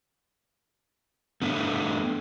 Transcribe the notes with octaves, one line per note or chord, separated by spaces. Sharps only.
A3 B3 D4 E5